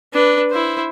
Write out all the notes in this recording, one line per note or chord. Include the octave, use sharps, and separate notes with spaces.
D4 B4
E4 C5